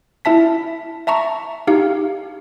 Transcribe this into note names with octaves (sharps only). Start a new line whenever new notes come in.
E4 E5 A5 B6
E5 A5 A#5 C#6
D#4 G4 F5